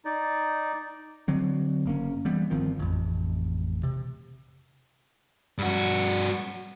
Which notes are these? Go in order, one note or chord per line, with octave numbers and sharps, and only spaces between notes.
D#4 D5
D3 F#3 C4
F#1 A#3 C#4
E3 G3 B3
G1 D#3 F3 C4
A1 F2
C3
G2 F#4